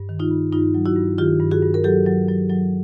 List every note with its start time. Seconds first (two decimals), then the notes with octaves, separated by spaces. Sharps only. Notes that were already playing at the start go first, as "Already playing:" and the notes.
Already playing: G2
0.09 D#3
0.20 D#4 F4
0.31 G2
0.52 G2 D#4 F4
0.74 F#3
0.86 E4 F#4
0.96 G2
1.18 D#3 F4 G4
1.40 G2
1.51 F#4 G#4
1.62 G2
1.74 A#4
1.84 F#3 G4 A4
2.06 F#3
2.28 F#3
2.50 F#3